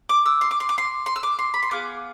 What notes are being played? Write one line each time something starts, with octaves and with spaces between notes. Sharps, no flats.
D6
E6
C6
D6
C6
D6
C6
C6
E6
D6
C6
B5
C6
B3 F4 G#4 D6